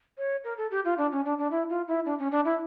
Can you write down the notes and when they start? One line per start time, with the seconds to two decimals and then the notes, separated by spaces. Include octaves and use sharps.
0.18 C#5
0.44 A#4
0.57 A4
0.71 G4
0.85 F4
0.98 D4
1.12 C#4
1.25 D4
1.38 D4
1.51 E4
1.70 F4
1.88 E4
2.05 D4
2.19 C#4
2.32 D4
2.45 E4